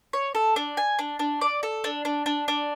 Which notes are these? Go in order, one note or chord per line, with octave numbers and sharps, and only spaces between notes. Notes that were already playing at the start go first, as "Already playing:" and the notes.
C#5
A4
D4
G#5
D4
D4
D5
A4
D4
D4
D4
D4